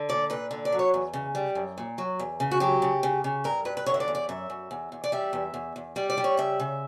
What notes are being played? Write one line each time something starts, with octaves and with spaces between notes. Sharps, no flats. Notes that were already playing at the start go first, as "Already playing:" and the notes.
Already playing: D3
A#2 D5
A#2 B4
D3
D5
F#3
C#5
E2
C#3
G3
F#2
A#2
F#3
E2
C#3
F#4
F#3 G4
C#3
C#3
C#3
G2 A#4
G2 B4
B4
D3 C#5
E5
D5
E2
D5
F#2 E5
F#2
E2
E2
D5
G3 E5
E2
E2
E2
G3 D5
D5
G3
C#5
C#3 E5
C#3